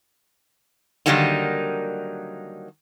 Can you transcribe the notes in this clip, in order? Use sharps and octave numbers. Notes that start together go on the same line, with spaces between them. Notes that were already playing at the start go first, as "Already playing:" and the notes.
D3 D#3 F#3 G3 A#3 D#4